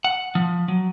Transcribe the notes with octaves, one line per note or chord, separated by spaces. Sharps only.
F#5
F3
F#3